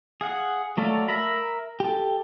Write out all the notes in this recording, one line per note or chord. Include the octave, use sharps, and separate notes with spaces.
G#4 F5 F#5
F#3 A3 A4 D5 F5
A#4 E5 A#5 B5
G4 A4